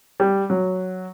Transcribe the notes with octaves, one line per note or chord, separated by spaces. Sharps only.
G3
F#3